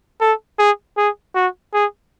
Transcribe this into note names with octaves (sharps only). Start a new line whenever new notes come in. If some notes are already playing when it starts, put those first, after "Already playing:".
A4
G#4
G#4
F#4
G#4